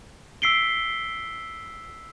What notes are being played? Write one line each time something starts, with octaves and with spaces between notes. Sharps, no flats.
E6 B6 C7 D7 G7